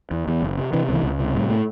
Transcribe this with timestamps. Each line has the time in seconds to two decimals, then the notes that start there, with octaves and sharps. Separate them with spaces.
0.11 E2
0.27 E2
0.42 F#1
0.57 C3
0.73 C3 E3
0.88 C#2 E3
1.03 C#2
1.19 C3
1.34 A2 G3
1.50 A3